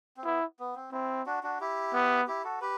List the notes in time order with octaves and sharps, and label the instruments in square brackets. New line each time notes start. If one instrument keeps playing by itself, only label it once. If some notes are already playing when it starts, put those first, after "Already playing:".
[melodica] C4
[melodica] B3 [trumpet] E4
[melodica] B3
C4
[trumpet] C4 [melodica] E4
[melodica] D4 F#4
D4 F#4
E4 G4
[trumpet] B3
[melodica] E4 G4
F#4 A4
G4 B4